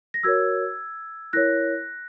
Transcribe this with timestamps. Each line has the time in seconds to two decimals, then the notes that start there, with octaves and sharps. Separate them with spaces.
0.14 A#6
0.23 F#4 A#4 C#5 E6 G#6
1.33 E4 A#4 C#5 F#6 A#6